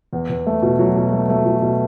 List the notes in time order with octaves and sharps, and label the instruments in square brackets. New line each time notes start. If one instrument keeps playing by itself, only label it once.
[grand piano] E2
E2
A3
B2
F#3
B2
A3
A3
F#3
B2